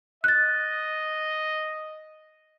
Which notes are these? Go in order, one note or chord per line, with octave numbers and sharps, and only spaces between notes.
D#5 F#6 A6